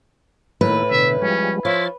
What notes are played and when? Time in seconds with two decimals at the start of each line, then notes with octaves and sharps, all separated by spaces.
0.61 A2 D#3 A#3 E4 B4
0.91 B2 D3 E5
1.22 F3 G3 G#3 C#4
1.65 F3 E4 C#5 C6 A6